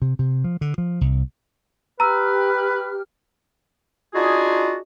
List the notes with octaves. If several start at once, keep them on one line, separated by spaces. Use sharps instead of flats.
C3
C3
F3
D3
F3
C2
G4 B4 A#5 E6 F6
D4 D#4 F4 F#4 G#4